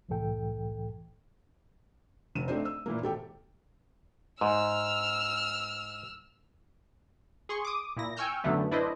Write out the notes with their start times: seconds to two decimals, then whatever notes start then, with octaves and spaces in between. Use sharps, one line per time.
0.09 C2 F#2 A2 E3 A4 G5
2.35 F1 D#7
2.48 A3 C4 D4 D#4 C5
2.65 E6
2.86 A#2 E3 A#3
3.02 G#1 G4 A4 G5
4.41 G#2 E6 F6
7.49 G#4 C6 C#6
7.65 D6 D#6
7.97 A#2 E4 A#6
8.17 G5 G#5 C#6 E6 F6 G6
8.44 F#2 A2 D3 F#3 A3 B3
8.71 D4 E4 B4 C5 D#5